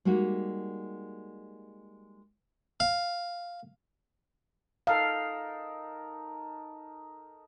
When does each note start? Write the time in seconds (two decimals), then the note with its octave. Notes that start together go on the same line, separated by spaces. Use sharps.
0.05 G3 G#3 A#3 D#4 F#4
2.80 F5
4.87 D#4 A4 A#4 F5